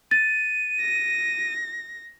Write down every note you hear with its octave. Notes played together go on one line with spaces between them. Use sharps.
A6 D#7
A#6